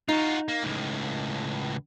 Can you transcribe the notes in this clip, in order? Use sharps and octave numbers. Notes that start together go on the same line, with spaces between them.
D#4 F4 F#4
A#3
C#2 A2